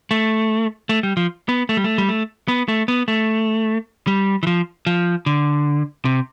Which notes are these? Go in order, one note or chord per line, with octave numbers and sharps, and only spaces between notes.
A3
A3
G3
F3
B3
A3
G3
A3
G3
A3
B3
A3
B3
A3
G3
E3
F3
F3
D3
C3